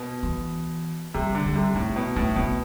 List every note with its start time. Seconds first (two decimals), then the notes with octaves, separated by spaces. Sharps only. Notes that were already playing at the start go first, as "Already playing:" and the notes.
Already playing: B2
0.23 E3
1.14 C3 G3
1.35 D3
1.45 G3
1.55 C3
1.75 A2 C4
1.96 B2
2.16 A2 D4
2.36 B2 C4